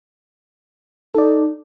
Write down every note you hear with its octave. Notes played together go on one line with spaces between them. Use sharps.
D#4 A4 D5